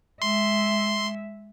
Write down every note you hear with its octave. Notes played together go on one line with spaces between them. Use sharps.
G#3 E5 C6